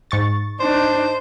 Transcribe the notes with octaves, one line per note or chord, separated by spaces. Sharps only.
G#2 C#6 A6
D4 D#4 C5